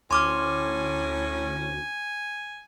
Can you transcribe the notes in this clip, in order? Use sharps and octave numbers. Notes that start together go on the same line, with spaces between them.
D2 A2 C#4 G#5 C6 D6 F6